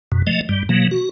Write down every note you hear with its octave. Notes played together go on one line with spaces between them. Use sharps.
F#2 B2
F3 A3 D#5
G2 G3
B2 E3 F#3 A#3
F#4